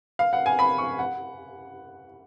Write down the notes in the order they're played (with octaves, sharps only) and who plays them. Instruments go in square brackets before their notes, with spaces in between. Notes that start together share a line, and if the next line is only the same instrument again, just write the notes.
[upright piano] F5
F#5
G#5
B5
C#6
F#5